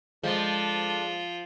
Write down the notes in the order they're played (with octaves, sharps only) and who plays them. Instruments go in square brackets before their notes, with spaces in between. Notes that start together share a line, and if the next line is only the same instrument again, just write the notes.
[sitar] F3 [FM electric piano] G#3 [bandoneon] D4 A4 [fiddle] F4